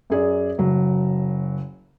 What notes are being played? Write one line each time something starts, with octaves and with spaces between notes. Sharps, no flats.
F#2 G#4 D5
F#1 F#3